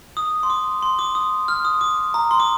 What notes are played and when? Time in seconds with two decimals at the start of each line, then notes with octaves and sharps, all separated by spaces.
0.17 D#6
0.43 C6
0.50 D6
0.82 C6
0.99 D6
1.15 D#6
1.48 F6
1.65 D#6
1.81 D6
2.14 A#5
2.31 C6
2.40 D6